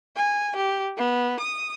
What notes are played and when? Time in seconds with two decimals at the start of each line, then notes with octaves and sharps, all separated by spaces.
0.16 G#5
0.56 G4
0.97 B3
1.40 D#6